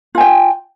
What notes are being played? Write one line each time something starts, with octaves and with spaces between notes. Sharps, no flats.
F4 G5 G#5